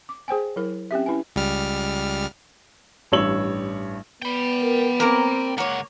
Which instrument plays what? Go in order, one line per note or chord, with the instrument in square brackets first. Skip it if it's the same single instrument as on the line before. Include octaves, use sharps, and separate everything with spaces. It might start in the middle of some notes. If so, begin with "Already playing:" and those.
[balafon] D6
G#4 C5 G5 G#5
F#3 E4 A#4
C4 C#4 G4 E5
C#4 E4 B4 G#5
[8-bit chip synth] C#2 G3 F6
[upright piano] A1 G2 C#5 E6 F#7
[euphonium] B3 [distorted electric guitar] G5 B5
[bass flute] A#4
[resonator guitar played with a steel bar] A#3 A#4 [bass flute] C4
[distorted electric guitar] C#2 F#5 [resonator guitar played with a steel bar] A#3 C#5